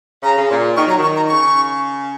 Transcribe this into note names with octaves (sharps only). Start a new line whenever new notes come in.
C#3 A#5
C#3
A#2
D#3 C#6
F#3 A#5
D#3 C#6
A#5
C#3 C#6